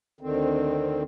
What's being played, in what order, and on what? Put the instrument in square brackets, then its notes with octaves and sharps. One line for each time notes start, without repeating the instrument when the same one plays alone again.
[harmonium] D2 D3 D#3 C4